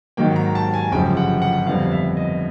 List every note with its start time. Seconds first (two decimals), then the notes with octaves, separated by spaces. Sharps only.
0.17 G#2 D#3 F#3 A#3 G5
0.36 A#5
0.55 A5
0.74 G#5
0.92 G1 F#2 C#3 F3 G5
1.17 F#5
1.42 F#5
1.67 F2 D3 G3 B3 F5
1.86 F5
1.92 E5
2.17 D#5